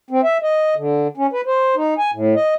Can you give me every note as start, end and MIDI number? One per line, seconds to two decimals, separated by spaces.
0.10 0.21 60
0.23 0.37 76
0.42 0.75 75
0.76 1.08 50
1.17 1.27 61
1.33 1.41 71
1.46 1.75 72
1.76 1.94 63
1.98 2.11 80
2.13 2.34 45
2.35 2.54 75